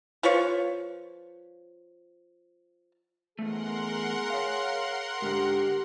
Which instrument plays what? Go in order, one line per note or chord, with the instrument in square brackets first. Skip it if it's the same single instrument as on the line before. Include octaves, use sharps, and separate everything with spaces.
[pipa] F3 F4 B4 C#5
[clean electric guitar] E2 A3 [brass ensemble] G#4 [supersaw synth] A#4 F#5 C6
[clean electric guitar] C#5 F5
[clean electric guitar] G#2 D3 D#4 [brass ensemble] G4